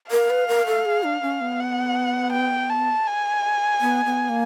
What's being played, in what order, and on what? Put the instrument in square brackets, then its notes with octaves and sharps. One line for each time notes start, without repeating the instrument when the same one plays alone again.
[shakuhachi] A#4 [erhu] F5
[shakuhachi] B4
A#4
A4
G#4
D4
C#4
B3
[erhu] F#5
G5
A5
G#5
[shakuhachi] B3
B3
A#3